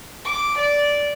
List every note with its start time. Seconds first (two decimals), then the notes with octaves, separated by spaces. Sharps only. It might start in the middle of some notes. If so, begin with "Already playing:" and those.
0.25 D6
0.57 D5